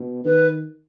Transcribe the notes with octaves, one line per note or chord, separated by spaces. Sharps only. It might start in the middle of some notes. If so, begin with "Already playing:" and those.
Already playing: B2
D#3 B4